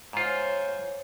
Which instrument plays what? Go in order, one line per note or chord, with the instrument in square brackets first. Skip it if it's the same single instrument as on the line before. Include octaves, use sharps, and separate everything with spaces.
[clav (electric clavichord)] G#2 F4 [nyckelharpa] C5 C#5